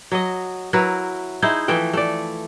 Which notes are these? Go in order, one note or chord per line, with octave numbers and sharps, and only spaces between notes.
F#3 D#5
F#3 E4 A#4 B4
D#4 E4 G#4 C5
E3 F3 A3 G5
A3 D5